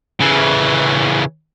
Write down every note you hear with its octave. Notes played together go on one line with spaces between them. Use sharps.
C#3 E3